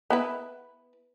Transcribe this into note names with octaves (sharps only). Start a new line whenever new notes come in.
B3 E4 B4